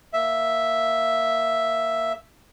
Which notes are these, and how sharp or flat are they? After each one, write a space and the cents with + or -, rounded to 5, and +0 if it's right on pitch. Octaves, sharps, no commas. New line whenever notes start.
A#3 +0 E5 +0